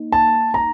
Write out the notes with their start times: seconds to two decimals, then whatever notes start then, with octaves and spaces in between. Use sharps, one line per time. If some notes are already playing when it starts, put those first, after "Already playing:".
Already playing: A#3 D#4
0.12 A5
0.54 A#5